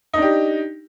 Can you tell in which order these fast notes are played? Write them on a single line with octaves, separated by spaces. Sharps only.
D#4 D4 G4